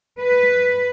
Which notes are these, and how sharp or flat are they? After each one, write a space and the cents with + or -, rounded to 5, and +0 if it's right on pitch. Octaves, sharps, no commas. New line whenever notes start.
B4 +0